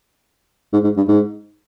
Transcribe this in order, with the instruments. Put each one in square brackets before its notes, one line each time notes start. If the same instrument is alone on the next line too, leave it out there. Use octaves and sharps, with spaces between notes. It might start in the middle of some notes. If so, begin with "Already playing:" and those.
[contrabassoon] G#2
G#2
G2
G#2